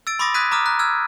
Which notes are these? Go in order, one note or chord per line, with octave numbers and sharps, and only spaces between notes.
E6 A6 D7
B5 C6 D6 D#6 A6 A#6
D#6 F#6 G#6 B6 D#7
A#5 D6 D#6 F6
A#5 F#6
E6 F6 G#6